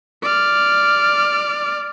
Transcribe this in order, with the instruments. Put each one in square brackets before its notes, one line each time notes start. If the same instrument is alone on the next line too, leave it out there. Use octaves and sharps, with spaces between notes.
[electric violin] D5 F6